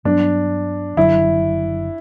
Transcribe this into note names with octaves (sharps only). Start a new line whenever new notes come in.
G2 F#3 B3 D4
F#1 F#2 D3 F#3 E4